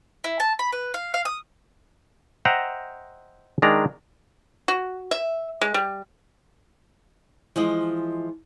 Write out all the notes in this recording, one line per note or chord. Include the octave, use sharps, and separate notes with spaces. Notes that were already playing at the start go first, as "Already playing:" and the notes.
E4
A5
B5
B4
F5
F5
D#6
C5 D#5 E5 F#5 G5 A#5
D#3 G#3 D4 D5 A#5
F#4
E5
G#3
G3
E3 F3 G#3 D#5